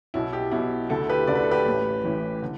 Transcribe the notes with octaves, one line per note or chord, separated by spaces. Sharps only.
B1 B2 E4
G4
B1 B2 E4
D2 D3 E4 A4
G4 B4
D2 D3 D5
B4
A4
G4 B4
A1 A2 E3
A1 A2 E3
D3